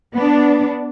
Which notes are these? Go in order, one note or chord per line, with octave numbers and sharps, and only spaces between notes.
B3 D4